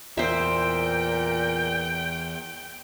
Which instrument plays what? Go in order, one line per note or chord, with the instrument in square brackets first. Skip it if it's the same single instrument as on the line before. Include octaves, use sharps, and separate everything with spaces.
[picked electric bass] E2 [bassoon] A#2 [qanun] C5 E5 [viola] G5